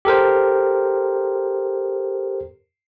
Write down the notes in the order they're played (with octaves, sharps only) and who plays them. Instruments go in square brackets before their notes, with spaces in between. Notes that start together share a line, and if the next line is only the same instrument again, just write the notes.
[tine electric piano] G4 A4 A#4 C5